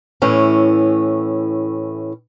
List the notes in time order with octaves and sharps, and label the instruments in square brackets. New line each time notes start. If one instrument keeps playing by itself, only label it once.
[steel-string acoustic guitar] A2 E3 C#4